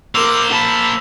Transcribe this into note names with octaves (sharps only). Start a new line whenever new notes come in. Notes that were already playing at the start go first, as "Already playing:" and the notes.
A#3 A#4 C5 D6 E6 F7
A5 B5